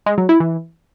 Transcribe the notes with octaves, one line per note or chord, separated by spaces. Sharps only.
G#3
F#3
E4
E3